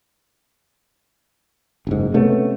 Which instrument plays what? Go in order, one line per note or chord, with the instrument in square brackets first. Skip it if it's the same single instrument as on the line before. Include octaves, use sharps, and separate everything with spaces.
[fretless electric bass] F#1 G#2
C3 A3 B3 C#4